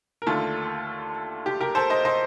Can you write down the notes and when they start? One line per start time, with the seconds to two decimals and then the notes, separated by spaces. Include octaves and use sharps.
0.22 A#4
0.27 D#2 D3 A3 F4 A4
1.46 G4
1.61 G4 A#4
1.75 A4 C5
1.90 C5 D#5
2.05 C5 D#5